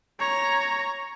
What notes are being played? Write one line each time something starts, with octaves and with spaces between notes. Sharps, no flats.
C#5 A#5